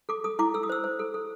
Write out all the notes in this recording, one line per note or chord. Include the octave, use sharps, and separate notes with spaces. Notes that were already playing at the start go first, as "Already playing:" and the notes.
A4 D6
A4 D#6
E4 D6
A4 E6
D#6
C5 E6
C5
A4
A4